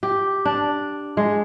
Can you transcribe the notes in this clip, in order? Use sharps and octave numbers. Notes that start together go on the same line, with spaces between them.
G4
D4
G#3